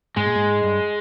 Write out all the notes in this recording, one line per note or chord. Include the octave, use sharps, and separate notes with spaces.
G#2 G#3
A#2
G#2
G2